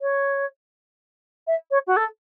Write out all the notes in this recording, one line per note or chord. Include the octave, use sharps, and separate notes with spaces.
C#5
E5
C#5
F#4
A4